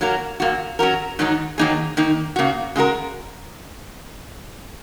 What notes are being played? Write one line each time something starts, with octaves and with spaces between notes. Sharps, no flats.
F#3 A#3 F#4 A#4
A#2 A#3 F#4
F#3 C#4 F#4 A#4
G#2 D#3 F#3 D#4
D#3 F#3 A#3 D#4 G#4
D#3 A#3 D#4
C#3 A#3 F#4
C#3 G#3 F#4 A#4